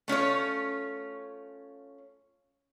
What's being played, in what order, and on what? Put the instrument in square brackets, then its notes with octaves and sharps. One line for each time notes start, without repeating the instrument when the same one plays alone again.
[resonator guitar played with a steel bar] A3 C#4 F4 C#5